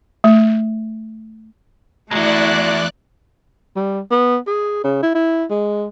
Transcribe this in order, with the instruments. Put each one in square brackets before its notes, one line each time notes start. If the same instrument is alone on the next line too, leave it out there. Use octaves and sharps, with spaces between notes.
[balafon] A3
[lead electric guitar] B1 E2 [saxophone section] G#3 F#4 [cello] A3 E4 [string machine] D5 F#6
[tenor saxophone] G3
B3
G#4
C#3
E4
E4
G#3